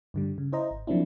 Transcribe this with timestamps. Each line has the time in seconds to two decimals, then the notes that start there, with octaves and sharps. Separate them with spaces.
0.14 G2 D3 G3
0.38 C#3
0.52 E4 C5 D#5 A#5
0.71 G#1
0.87 F3 F#3 A#3 C4 D4 E4